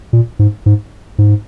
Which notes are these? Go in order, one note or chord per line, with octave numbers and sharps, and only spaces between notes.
A#2
G#2
G#2
G#2